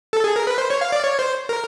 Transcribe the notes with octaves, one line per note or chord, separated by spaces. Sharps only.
A4
G#4
A#4
B4
C5
C#5
F5
D5
C#5
C5
A#4